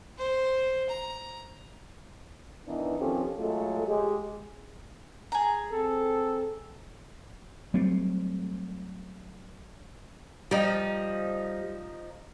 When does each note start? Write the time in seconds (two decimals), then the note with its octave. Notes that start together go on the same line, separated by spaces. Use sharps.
0.18 C5
0.89 A#5
2.66 D#3 E3 B3 D4 D#4
2.99 D#3 F3 C4 C#4 G4 A4
3.37 F#3 G#3 A3 F4 A4
3.87 G#3 G4 G#4
5.32 G#4 A#5
5.72 C4 A4
7.74 F#3 G3 A3 C4
10.51 F3 G3 D#4